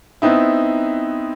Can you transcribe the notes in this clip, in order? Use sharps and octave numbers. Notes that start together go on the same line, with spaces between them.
B3 C4 D#4 E4